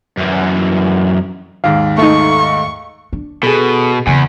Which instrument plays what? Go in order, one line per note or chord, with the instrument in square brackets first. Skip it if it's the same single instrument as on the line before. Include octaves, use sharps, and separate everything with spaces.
[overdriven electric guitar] F#2 E3
[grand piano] D#2 G#2 [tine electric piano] F5
[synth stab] A3 D#4 [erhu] C#6
[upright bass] D4
[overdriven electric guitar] B2 [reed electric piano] G#4 A4
[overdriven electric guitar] E2 [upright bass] C#3 [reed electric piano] G#5